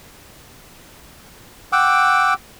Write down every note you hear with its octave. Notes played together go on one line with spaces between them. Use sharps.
F#5 G5 D6 E6